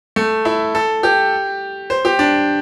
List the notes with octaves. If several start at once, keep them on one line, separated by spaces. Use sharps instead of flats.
A3
E4
A4
G4
C5
G4
D4